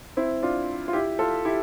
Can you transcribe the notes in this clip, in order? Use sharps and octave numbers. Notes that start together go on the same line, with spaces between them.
C4 E4
D4 F4
F4
E4 G4
F4 A4
E4 G4